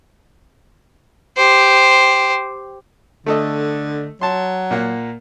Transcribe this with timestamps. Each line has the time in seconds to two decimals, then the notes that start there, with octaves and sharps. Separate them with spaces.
1.37 G4 C5
3.26 D3 A3 A4 D#5
4.21 F#3 A5 C6
4.71 A#2 A#3 F#5